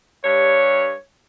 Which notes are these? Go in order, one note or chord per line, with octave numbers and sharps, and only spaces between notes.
G2 G3 C#5